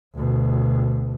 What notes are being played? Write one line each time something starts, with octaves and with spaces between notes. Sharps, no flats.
D2 B2